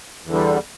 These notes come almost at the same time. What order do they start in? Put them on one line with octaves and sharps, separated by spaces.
E2 D3 G3